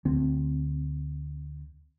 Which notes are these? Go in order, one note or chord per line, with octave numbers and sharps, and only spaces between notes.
D2 C4